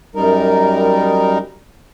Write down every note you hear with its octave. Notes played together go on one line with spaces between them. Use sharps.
F#2 G3 D#4 A#4